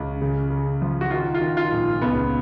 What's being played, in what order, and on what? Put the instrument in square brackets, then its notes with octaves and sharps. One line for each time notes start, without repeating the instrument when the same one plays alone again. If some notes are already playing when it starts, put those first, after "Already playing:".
Already playing: [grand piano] C#2
C#3
C#3
F3
F#4
D#3 F4
F4
D#3
F4
A#1
C#2 B3